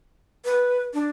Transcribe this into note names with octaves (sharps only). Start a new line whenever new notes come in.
B4
D4